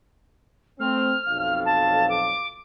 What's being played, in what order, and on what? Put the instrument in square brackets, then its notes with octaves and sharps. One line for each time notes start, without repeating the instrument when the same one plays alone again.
[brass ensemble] A3 C4 [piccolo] F6
[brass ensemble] B1 F2 F5
[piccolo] A5
D6